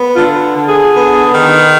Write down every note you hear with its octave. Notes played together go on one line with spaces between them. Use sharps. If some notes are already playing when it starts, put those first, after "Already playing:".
Already playing: B3
D3 F4
D3
G#4
B3
D#3